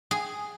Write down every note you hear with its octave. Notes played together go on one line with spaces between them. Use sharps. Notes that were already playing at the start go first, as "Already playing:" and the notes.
G#4